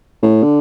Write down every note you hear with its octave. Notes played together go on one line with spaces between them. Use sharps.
A2
D3